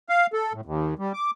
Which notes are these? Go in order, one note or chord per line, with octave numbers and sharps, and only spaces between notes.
F5
A4
A2
D#2
G3
D6